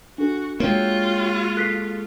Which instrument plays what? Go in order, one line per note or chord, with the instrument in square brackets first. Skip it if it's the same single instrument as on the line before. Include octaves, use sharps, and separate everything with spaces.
[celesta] D4 A4 [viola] F#4
[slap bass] G#3 A#3 [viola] F4 F#4 [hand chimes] A#4 C#5 G5
[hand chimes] A4 [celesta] F#6 B6 C7